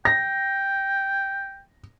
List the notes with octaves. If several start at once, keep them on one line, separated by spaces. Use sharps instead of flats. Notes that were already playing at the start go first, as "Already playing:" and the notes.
G5 A#6